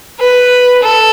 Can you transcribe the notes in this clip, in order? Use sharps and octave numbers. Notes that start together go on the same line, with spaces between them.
B4
A4